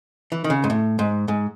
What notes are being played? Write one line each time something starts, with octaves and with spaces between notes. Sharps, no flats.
E3
D#3
C#3
G#2
A2
G#2
G#2